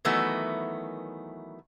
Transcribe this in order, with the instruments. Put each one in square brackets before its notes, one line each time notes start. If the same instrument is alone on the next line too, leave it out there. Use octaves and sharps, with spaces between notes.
[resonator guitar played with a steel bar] D#3 E3 F#3 A3 B3